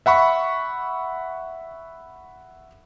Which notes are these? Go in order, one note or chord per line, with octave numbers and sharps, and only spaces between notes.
E5 F#5 B5 C#6